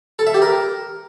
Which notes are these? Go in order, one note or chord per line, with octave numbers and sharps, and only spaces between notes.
A4
E5
G4
A#4